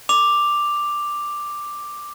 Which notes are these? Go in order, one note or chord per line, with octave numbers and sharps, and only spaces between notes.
D6 F7